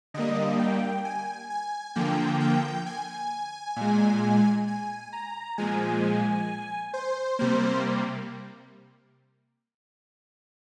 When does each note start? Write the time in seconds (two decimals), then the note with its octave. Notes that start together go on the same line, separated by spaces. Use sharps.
0.14 D3 G3 A#3 D#5
0.59 G5
1.05 G#5
1.50 G#5
1.95 D3 F3 A#3 G5
2.40 G5
2.86 G#5
3.76 A#2 G#3
4.68 G#5
5.13 A#5
5.58 A#2 F3 G#3 G#5
6.94 C5
7.39 C3 G3 A#3 C5